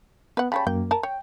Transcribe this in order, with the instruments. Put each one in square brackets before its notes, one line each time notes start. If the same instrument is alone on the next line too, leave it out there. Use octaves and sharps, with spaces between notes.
[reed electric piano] B3 [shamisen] B4 F#5
[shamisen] C#3 G3 C#5 [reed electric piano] G5 A5 B5
[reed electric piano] F#2 A#3 [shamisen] G5
[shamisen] A#4 A5
[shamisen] C#5 [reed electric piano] G5